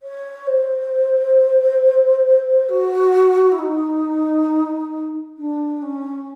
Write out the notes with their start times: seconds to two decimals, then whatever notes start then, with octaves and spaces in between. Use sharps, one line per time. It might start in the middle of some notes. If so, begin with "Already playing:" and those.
0.02 C#5
0.46 C5
2.69 F#4
3.52 E4
3.58 D#4
5.37 D4
5.82 C#4